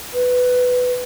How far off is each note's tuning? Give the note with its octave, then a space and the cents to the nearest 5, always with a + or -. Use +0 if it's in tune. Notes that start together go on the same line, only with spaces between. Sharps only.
B4 +10